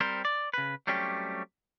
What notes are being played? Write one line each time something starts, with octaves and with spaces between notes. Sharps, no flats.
G3 C4 A#4 C5
D5
C#3 B4
F#3 G3 A3 C4 C#4 G4